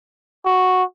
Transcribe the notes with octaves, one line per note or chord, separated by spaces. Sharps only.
F#4